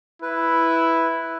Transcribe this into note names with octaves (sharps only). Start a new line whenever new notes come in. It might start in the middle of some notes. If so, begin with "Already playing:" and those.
E4 B4